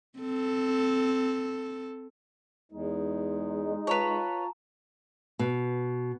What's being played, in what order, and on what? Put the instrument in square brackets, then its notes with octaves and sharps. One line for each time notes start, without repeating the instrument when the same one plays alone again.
[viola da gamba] C4 A4
[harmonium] E2 [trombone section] G#3 D#4
[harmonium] F4 [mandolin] B4 C#5 [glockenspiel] A5 A#5
[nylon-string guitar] B2